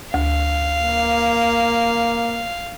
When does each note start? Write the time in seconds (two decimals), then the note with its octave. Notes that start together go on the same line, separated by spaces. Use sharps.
0.14 D2 F5
0.81 A#3